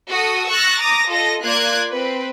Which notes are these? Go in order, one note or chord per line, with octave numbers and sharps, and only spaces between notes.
F#4 A4 D#6
C#6 E6 F#6 A6 A#6
A#5 D6 D#6 A#6
F4 A4 D#5 A#6
A#3 F4 D5 F#6 G#6
C4 B4